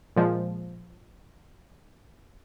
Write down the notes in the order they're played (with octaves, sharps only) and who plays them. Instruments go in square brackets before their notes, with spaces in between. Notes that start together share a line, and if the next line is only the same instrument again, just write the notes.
[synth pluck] A#2 F3 G#3